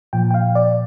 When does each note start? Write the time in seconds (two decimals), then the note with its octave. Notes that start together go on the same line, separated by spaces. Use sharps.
0.13 A#2 F3 G5
0.31 G5
0.34 F5
0.55 D5